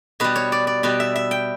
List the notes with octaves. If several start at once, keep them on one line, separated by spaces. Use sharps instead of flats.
B2 G3 B4
C#5
D5
D5
B2 G3 B4
E5
E5
G5